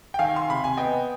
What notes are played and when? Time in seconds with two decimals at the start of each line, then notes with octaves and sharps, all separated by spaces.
0.14 G5
0.19 D#3 F5 G#5
0.36 C6
0.49 C3 B5
0.64 G#5
0.77 B3 D#5 G5